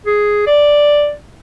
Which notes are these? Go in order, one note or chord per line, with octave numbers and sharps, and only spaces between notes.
G#4
D5